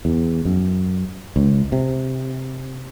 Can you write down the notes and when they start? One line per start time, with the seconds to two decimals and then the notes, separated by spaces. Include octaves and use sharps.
0.05 E2
0.45 F#2
1.36 C#2
1.72 C3